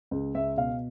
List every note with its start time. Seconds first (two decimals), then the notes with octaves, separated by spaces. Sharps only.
0.11 C#2
0.35 C#2 E5
0.57 B2 F5